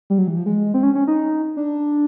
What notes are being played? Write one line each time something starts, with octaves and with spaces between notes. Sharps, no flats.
G3
F#3
E3
F3
G#3
C4
C#4
C#4
D#4
D4